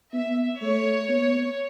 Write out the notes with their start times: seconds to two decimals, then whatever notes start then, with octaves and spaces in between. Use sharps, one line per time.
0.13 B3 E5
0.61 A3 C#5
1.09 B3